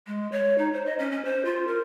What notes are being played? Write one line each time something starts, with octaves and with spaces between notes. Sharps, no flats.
G#3
C#5
D#4
C5
D#5
C#4
C#4
C5
F4
A#4